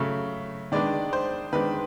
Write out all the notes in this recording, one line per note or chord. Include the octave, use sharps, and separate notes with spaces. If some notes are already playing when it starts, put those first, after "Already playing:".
Already playing: C#3 F#3 A3
D#3 G#3 B3 D4 D5
C5
D#3 G#3 B3 D4 B4